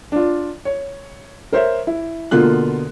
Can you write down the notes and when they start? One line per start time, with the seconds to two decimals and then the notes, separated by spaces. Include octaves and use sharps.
0.12 D4 F4
0.65 C#5
1.53 A#4 C5 C#5 E5
1.87 E4
2.31 B2 D3 A#3 B3 F4 F#6